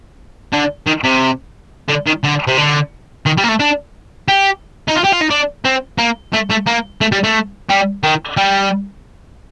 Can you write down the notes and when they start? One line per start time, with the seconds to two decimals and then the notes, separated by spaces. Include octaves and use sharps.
0.53 D3
0.87 D#3
1.04 C3
1.89 D3
2.07 D#3
2.24 D3
2.47 C3
2.58 D3
3.26 D#3
3.37 G3
3.44 A#3
3.48 A3
3.59 D4
4.28 G4
4.89 D#4
4.97 F4
5.05 G4
5.13 F4
5.22 D#4
5.30 D4
5.65 C4
5.98 A#3
6.33 A3
6.50 A3
6.66 A#3
7.01 A3
7.12 G3
7.24 A3
7.69 G3
8.03 D#3
8.37 G3